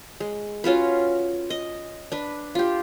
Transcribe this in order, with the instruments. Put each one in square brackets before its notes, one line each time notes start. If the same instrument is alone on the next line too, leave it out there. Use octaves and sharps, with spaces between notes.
[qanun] G#3
C#4 F4 F#4 B4
D#5
D4 B4
F4 G4